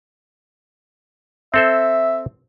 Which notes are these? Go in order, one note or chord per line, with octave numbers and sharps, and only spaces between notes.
C4 A4 C5 E5